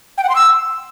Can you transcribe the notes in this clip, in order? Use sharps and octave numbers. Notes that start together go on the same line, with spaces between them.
G5
F#5
C6
E6